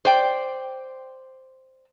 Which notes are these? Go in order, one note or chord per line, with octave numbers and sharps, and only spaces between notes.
C5 D5 G5